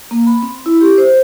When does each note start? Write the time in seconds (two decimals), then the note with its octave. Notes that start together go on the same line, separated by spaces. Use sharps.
0.11 A#3
0.26 B5
0.43 C4
0.66 E4
0.81 G4
0.98 C5